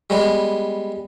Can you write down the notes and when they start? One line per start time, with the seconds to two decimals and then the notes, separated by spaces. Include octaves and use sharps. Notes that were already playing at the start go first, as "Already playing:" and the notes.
0.10 G3 G#3 B3